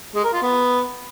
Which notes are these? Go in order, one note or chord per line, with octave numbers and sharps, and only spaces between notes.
G#3
A#4
F4
B3